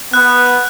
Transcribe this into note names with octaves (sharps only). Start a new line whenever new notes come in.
B3 F#6
F#6
F#6